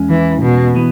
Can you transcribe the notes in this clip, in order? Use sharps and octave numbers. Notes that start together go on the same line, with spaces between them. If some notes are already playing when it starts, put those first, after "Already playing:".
Already playing: E2 G#3 C#4
E3
B2
E3 B3